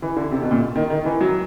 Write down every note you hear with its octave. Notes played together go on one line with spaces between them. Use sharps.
E3
D3
C3
B2
A#2
D#3
D#3
E3
F#3